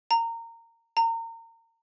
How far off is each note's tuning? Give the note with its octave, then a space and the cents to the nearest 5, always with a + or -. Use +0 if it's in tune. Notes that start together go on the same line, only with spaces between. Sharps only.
A#5 -20
A#5 -30